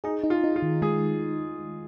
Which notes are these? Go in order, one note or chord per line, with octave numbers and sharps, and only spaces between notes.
D#4 G#4
D#4
F4
D#4
F4
D#3
G#3 G#4